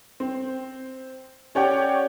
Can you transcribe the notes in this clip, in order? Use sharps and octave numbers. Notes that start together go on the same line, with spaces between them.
C4
C#4 G4 C#5 D5 F#5 G5